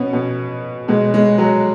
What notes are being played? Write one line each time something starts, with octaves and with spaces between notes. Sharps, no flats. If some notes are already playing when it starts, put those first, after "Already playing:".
Already playing: B2 B3 C#4
B2
B2 G#3
G#3
F#3